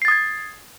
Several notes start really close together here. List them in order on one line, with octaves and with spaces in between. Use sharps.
C7 A6 D#6 G#6